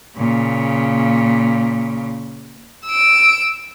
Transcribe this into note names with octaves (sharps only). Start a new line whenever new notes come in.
A#2 C#3
E6 D7